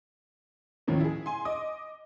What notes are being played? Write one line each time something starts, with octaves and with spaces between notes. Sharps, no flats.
D#2 A2 D#3 F3 A#3 C#4
E4 G#4
G#5 C6
D#5 D6 D#6